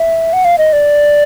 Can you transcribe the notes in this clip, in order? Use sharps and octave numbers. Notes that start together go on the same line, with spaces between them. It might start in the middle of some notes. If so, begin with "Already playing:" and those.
Already playing: E5
F#5
F5
D#5
D5